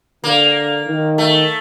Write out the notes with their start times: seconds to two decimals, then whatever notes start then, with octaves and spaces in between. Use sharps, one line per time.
0.24 D3 A#3
0.86 D#3
1.18 A3